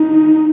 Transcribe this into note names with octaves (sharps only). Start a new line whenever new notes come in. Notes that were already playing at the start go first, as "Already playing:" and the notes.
Already playing: D#4